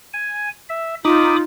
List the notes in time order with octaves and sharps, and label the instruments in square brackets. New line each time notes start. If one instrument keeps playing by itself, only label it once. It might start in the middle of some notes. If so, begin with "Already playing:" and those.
[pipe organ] G#5
E5
[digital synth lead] D#4 [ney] F4 [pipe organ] B5 D6 D#6